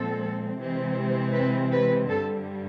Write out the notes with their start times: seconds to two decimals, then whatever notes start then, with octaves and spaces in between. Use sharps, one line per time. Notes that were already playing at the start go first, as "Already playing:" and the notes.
Already playing: A#2 F3 G#3 C4 A4
0.57 C3 E3 G#3 C4
1.34 B4
1.71 B4
2.08 G2 D3 G3 A4